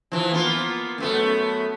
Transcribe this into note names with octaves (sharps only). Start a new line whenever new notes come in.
E3 F3
A#3 B3 F4
F#2 A3 B3